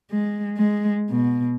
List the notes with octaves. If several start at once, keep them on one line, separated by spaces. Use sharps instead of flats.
G#3
G#3
B2